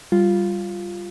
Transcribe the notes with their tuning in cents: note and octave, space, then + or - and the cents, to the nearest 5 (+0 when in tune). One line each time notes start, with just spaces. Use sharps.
G3 +0 F4 +0